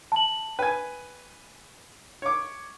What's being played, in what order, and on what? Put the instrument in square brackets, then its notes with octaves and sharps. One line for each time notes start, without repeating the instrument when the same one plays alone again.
[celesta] A5 F#7
[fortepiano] B4 G#5 [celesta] G5
[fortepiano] C#5 D6